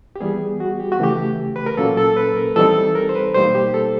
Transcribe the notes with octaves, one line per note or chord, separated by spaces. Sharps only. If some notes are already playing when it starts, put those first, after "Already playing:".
G4
E3 G3 B3 G#4
F#4
G4
F#4
C#3 E3 A3 G4
B4
A#4
A#2 F#3 A#3 C#4 A4
A4
B4
A#4
E3 G3 C4 D#4 A4
A#4
C5
B4
B2 G3 A#3 D#4 C5
G4
A4